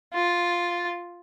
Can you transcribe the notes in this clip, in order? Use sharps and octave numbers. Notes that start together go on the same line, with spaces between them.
F4